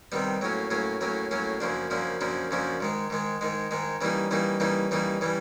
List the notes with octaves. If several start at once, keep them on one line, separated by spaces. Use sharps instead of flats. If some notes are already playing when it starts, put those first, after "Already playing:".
C3 D#3 G3 B3
A2 F#3 A#3 C#4
A2 F#3 A#3 C#4
A2 F#3 A#3 C#4
A2 F#3 A#3 C#4
F#2 C#3 F3 A#3 D4
F#2 C#3 F3 A#3 D4
F#2 C#3 F3 A#3 D4
F#2 C#3 F3 A#3 D4
G#2 D#3 G#3
G#2 D#3 G#3
G#2 D#3 G#3
G#2 D#3 G#3
C#3 E3 G3 A#3 D#4
C#3 E3 G3 A#3 D#4
C#3 E3 G3 A#3 D#4
C#3 E3 G3 A#3 D#4
C#3 E3 G3